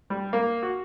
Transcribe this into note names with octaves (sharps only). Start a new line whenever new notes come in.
G3
A#3
F#4